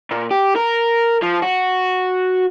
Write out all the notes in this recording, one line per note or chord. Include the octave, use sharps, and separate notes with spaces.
A#2
G4
A#4
F3
F#4